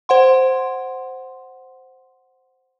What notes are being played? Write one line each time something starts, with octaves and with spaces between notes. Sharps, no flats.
C5 F#5 C6